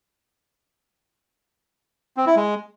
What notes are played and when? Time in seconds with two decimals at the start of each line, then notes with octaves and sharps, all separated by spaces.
2.17 C4
2.26 E4
2.36 G#3